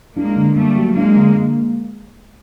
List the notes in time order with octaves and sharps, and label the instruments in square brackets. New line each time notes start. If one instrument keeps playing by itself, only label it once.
[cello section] G#3 A#3 [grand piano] D4
[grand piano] D3
[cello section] G3 A3 [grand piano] A#3
[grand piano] F#3
[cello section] G#3 A#3 [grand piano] D4
[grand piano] D3
A#3